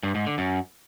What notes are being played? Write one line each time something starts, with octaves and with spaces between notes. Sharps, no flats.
G2
G#2
D3
F#2